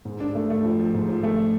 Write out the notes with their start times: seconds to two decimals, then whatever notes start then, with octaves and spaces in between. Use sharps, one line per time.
0.05 G#2
0.20 D4
0.35 A3
0.50 A3
0.64 F3
0.79 F3
0.95 G#2
1.09 F3
1.23 A3